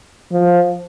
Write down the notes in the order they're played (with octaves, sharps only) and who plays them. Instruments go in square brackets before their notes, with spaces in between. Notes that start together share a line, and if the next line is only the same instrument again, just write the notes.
[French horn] F3